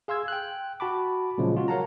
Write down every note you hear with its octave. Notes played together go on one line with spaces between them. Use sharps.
G#4 F5 C6 E6 G#6
G5 F#6
F#4 A5 B5 D6
A#2 C#3 F3 F#3 G#3
F4 F#4
A#4 C#5 F5 F#5 A5 A#5